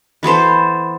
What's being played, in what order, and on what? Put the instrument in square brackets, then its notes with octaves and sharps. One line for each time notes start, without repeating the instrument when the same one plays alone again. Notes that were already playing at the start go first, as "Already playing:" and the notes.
[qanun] E3 B3 A4 C5